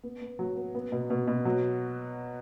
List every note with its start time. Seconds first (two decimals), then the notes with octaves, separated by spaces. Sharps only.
0.03 B3
0.22 B3
0.39 F#3
0.56 B3
0.75 B3
0.92 B2
1.10 B2
1.27 B2
1.45 F#3